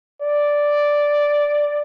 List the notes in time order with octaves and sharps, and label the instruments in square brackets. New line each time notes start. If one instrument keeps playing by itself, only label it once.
[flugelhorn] D5